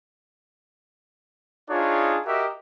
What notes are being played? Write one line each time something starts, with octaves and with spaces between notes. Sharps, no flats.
D4 D#4 F4 G#4 C#5
F#4 G4 A#4 D#5 E5